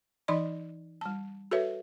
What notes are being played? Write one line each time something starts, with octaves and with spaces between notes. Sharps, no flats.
E3 D#4 D5 D#5 B5 C6
G3 A5
F#4 G#4 A4 B4 C#5 E5